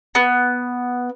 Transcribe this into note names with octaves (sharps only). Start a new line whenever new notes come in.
B3